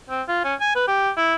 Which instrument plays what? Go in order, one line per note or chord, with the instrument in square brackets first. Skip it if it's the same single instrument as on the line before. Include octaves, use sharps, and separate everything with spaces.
[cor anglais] C4
F4
C#4
G#5
B4
G4
E4